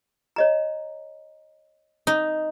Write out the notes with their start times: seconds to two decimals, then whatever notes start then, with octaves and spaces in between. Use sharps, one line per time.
0.36 C#5 D#5 A#5
2.07 D#4